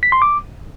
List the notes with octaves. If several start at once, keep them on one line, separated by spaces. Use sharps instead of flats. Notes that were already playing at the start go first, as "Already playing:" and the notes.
B6
C6
D6